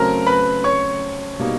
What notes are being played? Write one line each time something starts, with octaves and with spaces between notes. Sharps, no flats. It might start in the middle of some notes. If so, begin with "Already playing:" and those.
Already playing: C#3 F#3 A3 C4 A#4 A#5
B4 B5
C#5 C#6
B2 G3 A#3 D#4